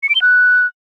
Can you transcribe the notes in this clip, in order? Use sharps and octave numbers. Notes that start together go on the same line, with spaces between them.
C#7
D7
G7
F#6